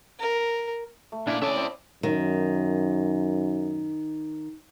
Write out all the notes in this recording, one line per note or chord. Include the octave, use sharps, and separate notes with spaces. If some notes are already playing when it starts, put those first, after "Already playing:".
A#4
A3
A#2 D4 E4 D5
C#4 E4 A4 D5 E5
C4
F#2 D#3